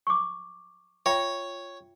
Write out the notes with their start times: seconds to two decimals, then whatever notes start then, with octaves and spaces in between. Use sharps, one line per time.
0.07 C#6 D6
1.06 F4 C#5 E5 G5